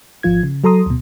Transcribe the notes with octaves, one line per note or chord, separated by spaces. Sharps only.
G#1 F3 F4 G#6
C#3
F#3 A4 A#5 C6 D#6
D2 B2